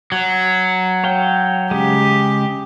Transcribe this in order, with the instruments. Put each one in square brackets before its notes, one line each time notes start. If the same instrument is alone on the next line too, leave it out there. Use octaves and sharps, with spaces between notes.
[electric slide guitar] F#3
[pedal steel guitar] C#5 F5 G5
[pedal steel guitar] C#3 G#3 [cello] G4